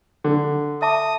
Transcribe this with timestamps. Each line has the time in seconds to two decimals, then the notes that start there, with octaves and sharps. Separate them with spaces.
0.24 D3
0.82 E5 A5 D6 D#6